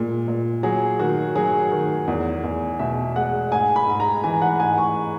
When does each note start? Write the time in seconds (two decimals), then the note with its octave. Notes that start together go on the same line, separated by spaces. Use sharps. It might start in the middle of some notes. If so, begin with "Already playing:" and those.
Already playing: A#2 G#3
0.28 A#2
0.63 F#3 G#4
0.99 D#3 F#4
1.35 F#3 G#4
1.72 D#3
2.08 E2
2.44 E2
2.79 B2 E5
3.16 G#3 F#5
3.52 G#2 G#5
3.76 B5
3.88 G#2
4.00 A#5
4.24 E3 G#5
4.42 F#5
4.60 G#2 G#5
4.78 C#6